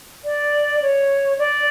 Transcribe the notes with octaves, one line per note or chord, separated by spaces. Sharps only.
D5
C#5
D5